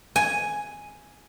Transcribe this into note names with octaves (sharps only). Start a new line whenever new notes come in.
G#5